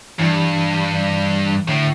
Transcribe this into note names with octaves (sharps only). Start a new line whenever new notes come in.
G2 E3
A2 D3